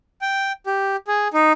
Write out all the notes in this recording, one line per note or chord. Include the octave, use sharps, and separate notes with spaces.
G5
G4
G#4
D#4